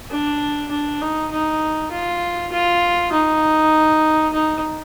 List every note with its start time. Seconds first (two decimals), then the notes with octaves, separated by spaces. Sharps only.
0.11 D4
0.71 D4
1.01 D#4
1.31 D#4
1.91 F4
2.52 F4
3.12 D#4
4.33 D#4